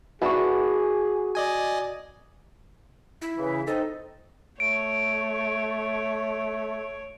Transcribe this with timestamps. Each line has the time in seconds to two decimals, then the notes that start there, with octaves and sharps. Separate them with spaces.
0.22 B3 D4 E4 F#4 G#4 C#6
1.35 D5 D#5 G#5
3.22 E4
3.38 C#3 E3
3.67 C4 D#4 A4 D#5
4.60 A3 C#5 D7